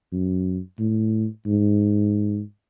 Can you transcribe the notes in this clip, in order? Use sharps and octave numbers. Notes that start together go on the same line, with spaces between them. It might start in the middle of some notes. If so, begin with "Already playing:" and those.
F#2
A2
G#2